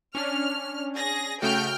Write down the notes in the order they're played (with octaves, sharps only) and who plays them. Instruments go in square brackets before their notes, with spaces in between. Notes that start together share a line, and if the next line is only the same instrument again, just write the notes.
[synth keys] C#4 D4 [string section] F6
[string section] G#4 A#6
[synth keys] C#3 A3 F#4 [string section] G5 F6 G6